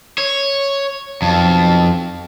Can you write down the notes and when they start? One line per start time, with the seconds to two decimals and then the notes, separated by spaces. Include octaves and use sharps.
0.18 C#5
1.22 B1 F2 F5 A5